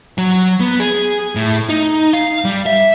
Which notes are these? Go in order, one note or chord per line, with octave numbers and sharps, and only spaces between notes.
F#3
B3
G#4
A2
D#4
F5
G3
E5